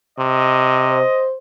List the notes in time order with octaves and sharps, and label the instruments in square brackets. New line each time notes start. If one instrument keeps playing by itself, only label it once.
[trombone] C3 [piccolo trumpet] D#5
[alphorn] C5